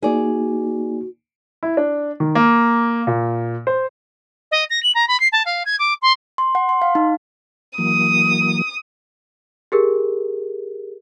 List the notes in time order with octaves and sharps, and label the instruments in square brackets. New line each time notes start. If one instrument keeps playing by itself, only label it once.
[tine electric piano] A#3 D#4 [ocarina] F#4 [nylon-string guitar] G#4 D5
[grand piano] E4
D4
D#3
A#3
A#2
C5
[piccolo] D#5
A#6
F#7
A#5
B5
C7
A5
F5
G#6
D6
C6
[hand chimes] C6
F#5
C6
F5
D#4
[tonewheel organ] E3 F#3 A#3 [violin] D#6
[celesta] G4 G#4 A#4